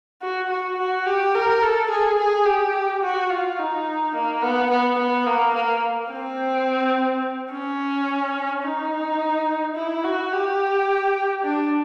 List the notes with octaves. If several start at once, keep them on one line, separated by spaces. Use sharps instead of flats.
F#4
F#4
F#4
G4
A#4
A4
G#4
G#4
G4
F#4
F4
D#4
A#3
B3
B3
B3
A#3
A#3
C4
C#4
D#4
E4
F#4
G4
D4